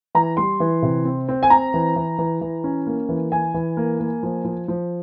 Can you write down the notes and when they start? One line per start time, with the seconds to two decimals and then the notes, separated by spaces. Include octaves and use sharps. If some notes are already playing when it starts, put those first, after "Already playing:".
0.15 E3 A#5
0.37 G3 C6
0.60 E3
0.82 C3
1.05 C4
1.29 C4
1.43 G#5
1.50 C4 A#5
1.74 E3
1.96 E3
2.18 E3
2.41 E3
2.64 C#4
2.86 A#3
3.09 E3
3.32 E3 G#5
3.54 E3
3.77 A#3
4.00 A#3
4.23 F3
4.45 F3
4.68 F3